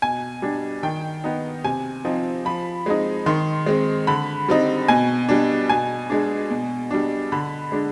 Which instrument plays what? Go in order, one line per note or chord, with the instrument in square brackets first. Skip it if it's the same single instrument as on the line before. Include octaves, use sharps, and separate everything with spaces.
[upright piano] B2 G#5
G3 D4
D#3 G5
B3 D#4
C3 G#5
F3 C4 D#4
F3 B5
G#3 C4 D#4
D#3 C6
G#3 C4
D3 B5
G3 C4 D#4
B2 G#5
G3 D4
B2 G#5
G#3 D4
B2
G3 D4
D3 B5
G#3 D4